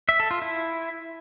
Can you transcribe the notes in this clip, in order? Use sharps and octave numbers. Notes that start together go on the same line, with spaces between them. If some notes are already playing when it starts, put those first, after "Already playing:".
E5
A4
F4
E4